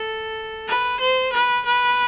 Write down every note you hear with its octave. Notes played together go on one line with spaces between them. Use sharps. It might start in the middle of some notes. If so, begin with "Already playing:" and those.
Already playing: A4
B4
C5
B4
B4